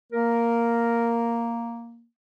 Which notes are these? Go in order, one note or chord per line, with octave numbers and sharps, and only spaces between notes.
A#3 A#4